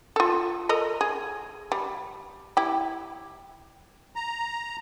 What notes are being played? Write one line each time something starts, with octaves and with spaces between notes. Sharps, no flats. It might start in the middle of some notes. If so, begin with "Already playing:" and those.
F4 A4
A4 A#4 D#5
G#4
G3
E4 G4
A#5